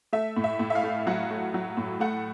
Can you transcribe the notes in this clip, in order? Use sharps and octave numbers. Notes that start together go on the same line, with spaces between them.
A3 E5
A2
E5
A2
E5
F5
A3
F#3 F#5
A3
F#3
A2
A3 F#5